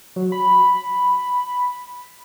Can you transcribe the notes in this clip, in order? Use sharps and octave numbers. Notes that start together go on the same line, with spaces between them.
F#3
B5